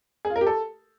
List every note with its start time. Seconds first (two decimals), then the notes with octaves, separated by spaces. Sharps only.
0.25 G#4
0.30 F4
0.36 A#4
0.41 G4
0.47 A4